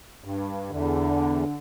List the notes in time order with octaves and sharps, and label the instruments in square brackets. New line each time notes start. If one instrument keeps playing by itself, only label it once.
[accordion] G2
[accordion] E2 [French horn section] D3